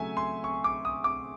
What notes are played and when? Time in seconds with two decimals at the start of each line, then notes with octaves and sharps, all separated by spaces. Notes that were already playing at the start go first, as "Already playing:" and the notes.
Already playing: C#3 F#3 A3 E5 G#5
0.17 C6
0.44 C#6
0.64 D6
0.85 D#6
1.04 D6